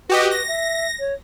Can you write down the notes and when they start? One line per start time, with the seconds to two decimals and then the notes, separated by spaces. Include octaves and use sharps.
0.09 F#4 G4 B4 D#5
0.31 A#6
0.48 E5
1.00 C#5